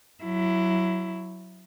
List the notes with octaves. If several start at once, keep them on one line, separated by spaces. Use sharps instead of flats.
F#3 E4